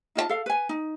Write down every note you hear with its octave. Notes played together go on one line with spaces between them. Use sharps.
D#4 F4 D5 A5
A4 F5
B4 G#5
D#4